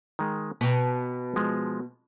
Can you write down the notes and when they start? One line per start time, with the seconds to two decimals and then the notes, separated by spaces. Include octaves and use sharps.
0.19 D#3 G#3
0.61 B2 B4 G5 A#5
1.36 F3 G#3